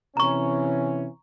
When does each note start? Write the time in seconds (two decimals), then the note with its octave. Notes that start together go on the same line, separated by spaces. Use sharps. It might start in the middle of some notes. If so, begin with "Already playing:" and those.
0.17 C3 E3 C#4 A#5 C#6